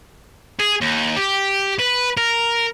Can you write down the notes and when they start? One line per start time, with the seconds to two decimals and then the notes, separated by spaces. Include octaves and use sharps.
0.60 G#4
0.81 D#2
1.17 G4
1.80 B4
2.17 A#4